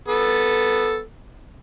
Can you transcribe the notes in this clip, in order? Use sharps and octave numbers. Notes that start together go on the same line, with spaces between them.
B3 A4